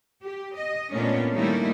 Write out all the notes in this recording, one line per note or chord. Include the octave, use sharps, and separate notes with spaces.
G4
D#5
A#2 A3 B3 C#4 D4
D#3 G3 A3 A#3 D#4 E4